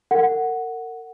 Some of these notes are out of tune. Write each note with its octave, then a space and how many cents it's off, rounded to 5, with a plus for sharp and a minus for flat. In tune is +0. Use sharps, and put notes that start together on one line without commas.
A#4 -35 F#5 +0